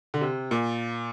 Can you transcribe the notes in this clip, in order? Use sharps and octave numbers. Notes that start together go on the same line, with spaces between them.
D3
C3
A#2